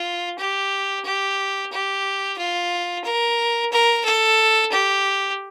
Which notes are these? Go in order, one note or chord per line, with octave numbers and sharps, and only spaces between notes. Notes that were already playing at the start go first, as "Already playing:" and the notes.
Already playing: F4
G4
G4
G4
F4
A#4
A#4
A4
G4